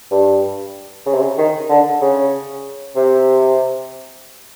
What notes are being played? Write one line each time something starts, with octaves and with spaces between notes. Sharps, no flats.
G2
C#3
C3
C#3
D#3
D3
C#3
C3